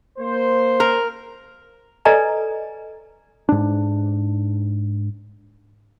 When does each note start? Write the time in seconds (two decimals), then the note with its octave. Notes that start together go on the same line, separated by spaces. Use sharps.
0.19 A#3 C5
0.80 A#4
2.05 A4 B4 D5 D#5 G#5 A#5
3.49 G#2 D4